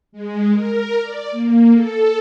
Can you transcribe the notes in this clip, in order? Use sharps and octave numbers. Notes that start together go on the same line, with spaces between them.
G#3
A#4
D5
A#3
A4